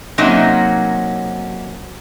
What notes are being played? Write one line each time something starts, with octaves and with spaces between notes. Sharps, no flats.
C3 F#3 A#3 C#4 D#4 F#4